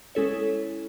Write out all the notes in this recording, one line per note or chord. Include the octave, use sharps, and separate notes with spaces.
G#3 C#4 E4 A4 C#5